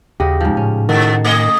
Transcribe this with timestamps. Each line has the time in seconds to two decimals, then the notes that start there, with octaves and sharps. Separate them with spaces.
0.20 D#2 C#3 F#4 G4 D#5
0.41 G#2 F3
0.57 A2 C#4
0.89 G#2 D#3 F#4 A4
1.25 A3 G#4 D#5